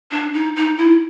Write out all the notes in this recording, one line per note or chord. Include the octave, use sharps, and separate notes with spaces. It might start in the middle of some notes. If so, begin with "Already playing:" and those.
D4
D#4
D#4
E4